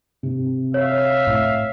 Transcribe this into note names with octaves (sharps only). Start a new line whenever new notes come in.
C3
C#5 E5 F5
A2